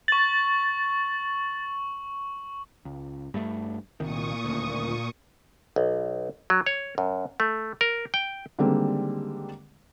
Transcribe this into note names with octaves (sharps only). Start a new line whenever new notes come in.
C#6 A6 F#7
C#2
G2 A3
C2 A#2 D#3 C#6 D#6
D#1 D2
B1
F#3
C#5
F#2
A3
A#4
G5
D3 D#3 G3 G#3 A#3 C4